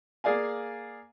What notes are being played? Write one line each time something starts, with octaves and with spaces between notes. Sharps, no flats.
A#3 G#4 D5 F5 G#5